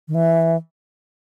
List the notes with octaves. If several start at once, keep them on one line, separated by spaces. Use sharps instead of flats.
D#3
E3